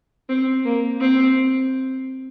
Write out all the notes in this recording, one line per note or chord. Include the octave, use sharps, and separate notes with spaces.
C4
A#3
C4